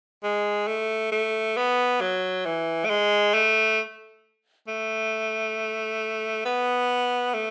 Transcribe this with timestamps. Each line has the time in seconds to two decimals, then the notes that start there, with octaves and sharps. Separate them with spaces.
0.23 G#3
0.67 A3
1.12 A3
1.57 B3
2.01 F#3
2.45 E3
2.85 A3
2.90 G#3
3.34 A3
4.68 A3
6.45 B3
7.34 A3